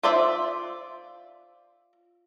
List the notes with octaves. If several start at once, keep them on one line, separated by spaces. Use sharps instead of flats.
F4 C5 D5 E5